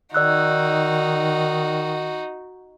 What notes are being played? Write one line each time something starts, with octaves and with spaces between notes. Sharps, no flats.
D#3 D#4 F#4 D5 E6 F#6